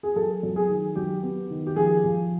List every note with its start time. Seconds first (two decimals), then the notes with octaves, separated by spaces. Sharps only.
0.03 G#4
0.16 F#3 A4
0.43 F#3
0.56 G#4
0.69 D#3
0.96 F#3 G4
1.23 B3
1.50 D#3
1.67 G4
1.76 F3 G#4
2.04 F3